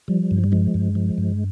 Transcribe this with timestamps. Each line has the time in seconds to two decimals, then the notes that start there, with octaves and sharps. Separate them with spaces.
0.08 F3 G3
0.31 G2
0.44 G3
0.52 F3 G#3
0.74 G2
0.95 F3
1.18 G2